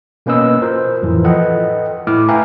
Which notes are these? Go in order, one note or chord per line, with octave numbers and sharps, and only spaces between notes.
B2 A#3 C#4 B4 D#5 E6
F4 A#4 C5
F2 A2 E3 F3
A4 B4 D#5 F#5 G5
A2 A3 E4 D6 F6
B4 E5 F5 G5 G#5 A#5